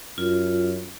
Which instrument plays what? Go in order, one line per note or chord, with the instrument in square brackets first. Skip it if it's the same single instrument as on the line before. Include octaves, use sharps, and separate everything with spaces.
[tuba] F#2 [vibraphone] F4